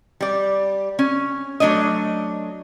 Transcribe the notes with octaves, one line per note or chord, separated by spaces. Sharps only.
G3 D5
C#4
F#3 A3 D4 D5 D#5